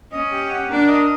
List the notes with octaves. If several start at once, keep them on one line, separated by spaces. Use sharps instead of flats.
C#4 D#5
G4
F#5
D4 A#4
D#5